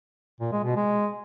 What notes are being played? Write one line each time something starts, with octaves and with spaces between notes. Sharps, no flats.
A#2
G#3
B2
G#3